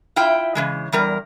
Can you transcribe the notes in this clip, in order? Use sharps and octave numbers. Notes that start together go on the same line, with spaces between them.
E4 F4 E5 G5
C#3 E3 G#3
E2 G3 A#4